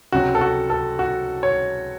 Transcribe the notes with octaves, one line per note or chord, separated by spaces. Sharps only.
C#2 C3 F#3 F#4
A4
F#4
A4
F#4
C#5